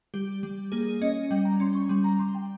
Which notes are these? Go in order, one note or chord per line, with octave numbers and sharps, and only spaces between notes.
G3 G4
G3
A#3 G#4
C#4 D#5
G3 G5
A#5
C#4 C6
C#6
G3 C6
A#5
G3 C6
G5